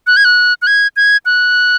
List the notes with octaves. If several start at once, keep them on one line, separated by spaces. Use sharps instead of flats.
F#6
G#6
F#6
F#6
G#6
G#6
F#6